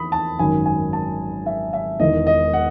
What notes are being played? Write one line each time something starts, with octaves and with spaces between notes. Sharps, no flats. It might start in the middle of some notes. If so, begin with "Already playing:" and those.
Already playing: E2 B5 D#6
A5
G#1 F#2 D#3 G#5
G#5
A5
E5
E5
E1 E2 D#3 D#5
D#5
F#5